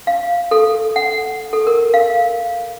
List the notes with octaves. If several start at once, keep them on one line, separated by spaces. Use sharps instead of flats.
F5
A4
F#5
A4
A#4
F5